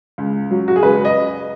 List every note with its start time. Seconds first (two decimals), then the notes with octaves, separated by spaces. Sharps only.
0.18 C#2
0.51 F#3
0.68 F#4
0.76 G#4
0.83 C#2 B4
1.05 D#5